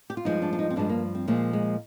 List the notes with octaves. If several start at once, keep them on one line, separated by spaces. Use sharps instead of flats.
G4
F4
G2 F3 G#3 D#4
D4
D4
D#4
C4
G2 F3 G#3 D4
A#3
C4
A#2 F3 G#3 A#3
G#3